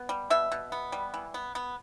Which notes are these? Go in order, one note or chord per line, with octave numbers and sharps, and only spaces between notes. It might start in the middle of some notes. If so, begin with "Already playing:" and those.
Already playing: B3
G3
B2 E5
B2
B3
G3
E3
B3
B3